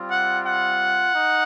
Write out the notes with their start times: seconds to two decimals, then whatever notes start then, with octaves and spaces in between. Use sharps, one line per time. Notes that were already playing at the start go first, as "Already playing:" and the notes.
Already playing: G3 C4 F4
0.11 F#5
0.46 F#5
1.15 D#4